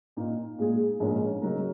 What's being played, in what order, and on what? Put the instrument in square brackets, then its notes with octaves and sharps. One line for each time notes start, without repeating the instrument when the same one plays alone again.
[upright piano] A#2 A#3 D#4
A#2 G#3 D#4 G#4
A#1 G#2 G#3 C#4 A#4
C#3 F#3 D#4 A#4